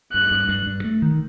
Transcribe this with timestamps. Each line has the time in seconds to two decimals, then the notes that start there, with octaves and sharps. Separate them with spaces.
0.13 G2 F#6
0.31 G2
0.49 G2
0.67 G2
0.84 A3
1.02 D#3